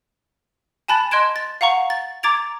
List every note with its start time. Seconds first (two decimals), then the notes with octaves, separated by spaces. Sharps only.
0.88 G#5 A5 B5 F#6 A6
1.11 D#5 C6 F#6 G#6 D7 E7
1.36 A6
1.61 F5 F#5 A#5 C#6
1.90 A6
2.23 A#5 D6 G#6 A6 D7 F7